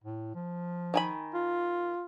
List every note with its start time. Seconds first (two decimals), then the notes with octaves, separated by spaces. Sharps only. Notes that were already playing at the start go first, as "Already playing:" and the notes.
0.04 A2
0.34 F3
0.94 D#3 G#5 B5
1.34 F4